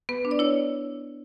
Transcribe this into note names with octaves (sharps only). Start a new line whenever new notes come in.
B3 B4
D4
D5
E4 C#5